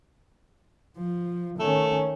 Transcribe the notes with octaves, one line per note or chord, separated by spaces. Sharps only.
F3
D#3 A3 C#4